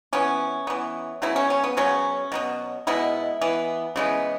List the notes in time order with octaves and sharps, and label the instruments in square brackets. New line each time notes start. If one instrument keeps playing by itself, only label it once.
[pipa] E3 B3 C#4
E3 B3
C#3 F#3 B3 E4
C#4
C#4
B3
C#3 F#3 B3 C#4
B2 F#3 B3
B2 G#3 B3 E4
E3 B3
C#3 E3 G#3 B3